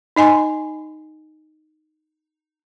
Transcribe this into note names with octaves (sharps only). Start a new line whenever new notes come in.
D#4 D#5 G#5 C6